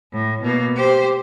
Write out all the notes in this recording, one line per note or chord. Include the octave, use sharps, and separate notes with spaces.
A2
B2 A#3
G4 C5